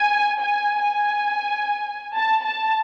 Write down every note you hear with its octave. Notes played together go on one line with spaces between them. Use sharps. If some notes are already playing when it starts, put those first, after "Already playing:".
Already playing: G#5
G#5
G#5
A5
A5